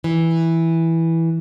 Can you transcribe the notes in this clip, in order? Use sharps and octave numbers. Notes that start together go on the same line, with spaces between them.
E3